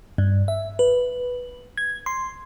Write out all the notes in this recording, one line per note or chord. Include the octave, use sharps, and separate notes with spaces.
G2
E5
B4
G#6
C6